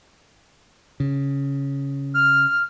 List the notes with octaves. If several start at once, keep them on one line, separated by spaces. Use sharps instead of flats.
C#3
F6